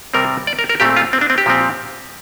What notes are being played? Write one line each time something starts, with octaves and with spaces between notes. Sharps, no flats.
C3 G3 C4 A#4
D5
A#4
A#4
A#2 A3 C4 G4
F4
C4
D4
C4
G4
A#2 F3 C4